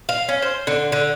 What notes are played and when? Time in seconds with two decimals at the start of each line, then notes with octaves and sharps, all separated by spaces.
0.09 F5
0.29 C#4
0.42 C5
0.67 D3
0.92 D3